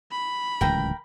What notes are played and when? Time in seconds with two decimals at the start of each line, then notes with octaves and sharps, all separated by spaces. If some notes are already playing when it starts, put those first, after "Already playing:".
0.12 B5
0.61 D1 C#2 E3 A#4 G5 A#5